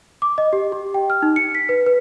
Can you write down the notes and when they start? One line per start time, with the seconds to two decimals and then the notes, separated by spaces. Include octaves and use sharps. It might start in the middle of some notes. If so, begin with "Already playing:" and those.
0.22 D6
0.38 D#5
0.53 G4
0.72 G4
0.94 G5
1.10 F6
1.22 D#4
1.36 C#7
1.55 B6
1.69 B4
1.86 B4